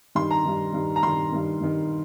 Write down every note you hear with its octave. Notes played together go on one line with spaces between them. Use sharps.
G2 D#3 C6
A#5
G2 D#3
G2 D#3
A#5
G2 D#3 C6
G2 D#3
G2 D#3